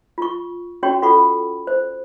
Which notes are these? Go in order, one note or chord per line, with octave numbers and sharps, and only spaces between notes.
F4 C#6
C#4 F#4 C#5 G5 A#5 C#6
F4 A4 F#5 B5 C#6
C5